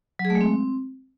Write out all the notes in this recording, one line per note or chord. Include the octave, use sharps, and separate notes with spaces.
F#3
G#4
A3
G#3
C4